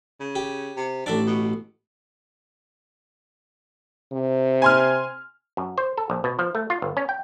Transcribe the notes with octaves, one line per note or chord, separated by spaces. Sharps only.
C#3
G4
C3
A1 D4 E5 D6
B2
C3
G#5 C6 F6
F#2
C5
A4
A#1
B2
F3
A3
F4
G1
C#4
G5